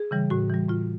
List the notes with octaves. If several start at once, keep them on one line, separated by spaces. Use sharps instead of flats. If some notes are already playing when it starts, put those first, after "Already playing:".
Already playing: G#4
C#3 E3 G3
A2 F#4
E3 G3
A2 F4